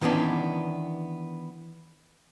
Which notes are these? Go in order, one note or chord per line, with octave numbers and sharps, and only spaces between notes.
D#3 E3 B3 C#4 D4